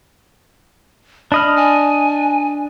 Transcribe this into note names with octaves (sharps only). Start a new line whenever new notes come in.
D4 D#5 B5 F6
G#5